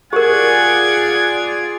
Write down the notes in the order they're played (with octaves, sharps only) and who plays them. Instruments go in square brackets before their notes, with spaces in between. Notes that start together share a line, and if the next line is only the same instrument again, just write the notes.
[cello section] F4 G#4 D5 [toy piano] G4 A#4 [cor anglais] F#5 [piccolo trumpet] G#6